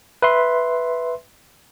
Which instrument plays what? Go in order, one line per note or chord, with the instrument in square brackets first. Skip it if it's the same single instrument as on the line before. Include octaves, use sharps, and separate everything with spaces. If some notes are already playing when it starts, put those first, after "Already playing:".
[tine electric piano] B4 E5 C6